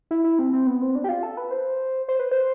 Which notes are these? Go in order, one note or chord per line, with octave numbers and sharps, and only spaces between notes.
E4
E4
C4
C4
B3
C4
D4
G4
F4
A4
B4
C5
C5
B4
C5